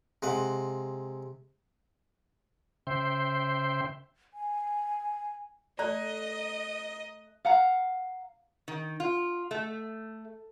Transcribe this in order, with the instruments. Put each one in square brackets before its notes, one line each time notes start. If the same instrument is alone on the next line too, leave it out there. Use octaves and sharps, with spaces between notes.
[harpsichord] C3 G#3 F#5
[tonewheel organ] C#3 C5 E5 G5 C6
[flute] G#5
[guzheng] A3 [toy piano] D5 [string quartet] D#5 [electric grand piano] A#5 F#6
[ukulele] F5 F#5 A#5
[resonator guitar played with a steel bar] D#3
F4
A3